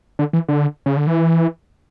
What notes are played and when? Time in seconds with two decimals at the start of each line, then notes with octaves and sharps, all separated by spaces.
0.19 D3
0.33 E3
0.49 D3
0.86 C#3
0.97 D3
1.07 E3